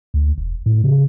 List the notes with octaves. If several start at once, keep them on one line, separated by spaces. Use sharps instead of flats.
D2
E1
A2
C#3